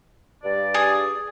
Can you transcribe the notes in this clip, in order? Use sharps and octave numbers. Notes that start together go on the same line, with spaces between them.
G2 D5
G#4